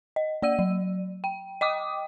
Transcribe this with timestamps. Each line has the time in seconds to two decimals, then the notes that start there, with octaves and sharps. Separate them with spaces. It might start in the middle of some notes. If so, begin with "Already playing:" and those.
0.16 D#5
0.42 A#3 D5 E6 D#7
0.59 F#3
1.24 G5
1.61 D#5 G5 D6 D#6